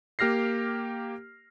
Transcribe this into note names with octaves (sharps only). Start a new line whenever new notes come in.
A#3 G4 F6 A#6 C7